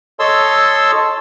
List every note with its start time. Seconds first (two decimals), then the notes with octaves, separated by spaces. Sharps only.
0.20 A4 C#5 D#5 A5 C6 E6